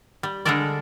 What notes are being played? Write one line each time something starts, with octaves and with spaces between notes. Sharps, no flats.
G3
D3 G3 G#3 A4 A#4 D5